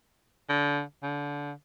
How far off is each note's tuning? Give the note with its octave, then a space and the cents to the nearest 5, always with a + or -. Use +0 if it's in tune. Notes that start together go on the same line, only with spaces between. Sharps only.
D3 -25
D3 -25